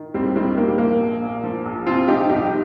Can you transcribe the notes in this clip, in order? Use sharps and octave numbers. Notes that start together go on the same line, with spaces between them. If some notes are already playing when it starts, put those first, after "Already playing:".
Already playing: D#3
D#2 G3 C4
D#3 G3 C4
A#2 A#3
G3
F3 A#3
A#1
A#2
F3
A#1
C3 C4 F4
F3 D#4 G4
C2 D#4 G4